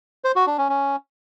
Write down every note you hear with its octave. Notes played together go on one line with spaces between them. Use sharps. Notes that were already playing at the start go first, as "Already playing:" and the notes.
C5
F#4
D4
C#4
C#4